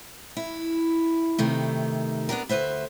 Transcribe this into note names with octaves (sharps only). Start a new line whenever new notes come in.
E4
G2 C3 D#3 A3
B3 D4 G4 A#4
D2 G2 B4 C5 E5